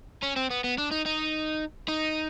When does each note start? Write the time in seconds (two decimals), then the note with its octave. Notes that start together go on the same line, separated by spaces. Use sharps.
0.22 C#4
0.36 C4
0.50 B3
0.64 B3
0.78 D4
0.91 D#4
1.06 D#4
1.89 D#4